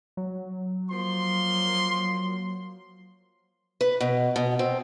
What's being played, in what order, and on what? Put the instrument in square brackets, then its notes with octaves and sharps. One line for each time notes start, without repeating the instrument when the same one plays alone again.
[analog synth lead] F#3
[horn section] F3 A#3 C6
[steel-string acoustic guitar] B4
B2
B2
C4